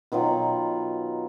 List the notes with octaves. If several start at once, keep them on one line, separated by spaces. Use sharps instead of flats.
B2 D#3 F#3 F4